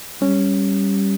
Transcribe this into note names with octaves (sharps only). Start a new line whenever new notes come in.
G3 C#4